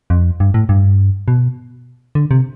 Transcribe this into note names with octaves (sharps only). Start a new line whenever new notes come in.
F2
G2
A2
G2
B2
D3
C3